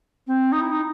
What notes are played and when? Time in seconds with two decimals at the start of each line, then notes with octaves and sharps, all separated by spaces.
0.27 C4
0.52 D#4
0.61 E4
0.71 D#4